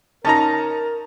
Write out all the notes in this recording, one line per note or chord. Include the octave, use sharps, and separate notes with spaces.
C#4 D#4 A#4 A5 A#5